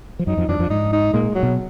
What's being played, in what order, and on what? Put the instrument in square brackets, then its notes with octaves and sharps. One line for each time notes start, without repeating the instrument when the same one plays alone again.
[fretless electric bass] F3
[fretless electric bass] F#2 F#3 [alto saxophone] D#4
[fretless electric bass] F2 F3
[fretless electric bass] F2 F3 [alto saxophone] D4
[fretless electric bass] F#3
F2 F3
[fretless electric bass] G#2 G#3 [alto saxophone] D#4
[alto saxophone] D#4
[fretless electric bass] A#2 A#3 [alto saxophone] G#3
[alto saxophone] F#3
[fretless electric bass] B2 B3